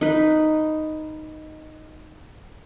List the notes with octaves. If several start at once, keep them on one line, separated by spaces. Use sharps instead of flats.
D#4 B4